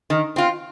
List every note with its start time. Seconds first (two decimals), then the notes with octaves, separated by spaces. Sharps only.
0.10 D#3
0.36 C4 F4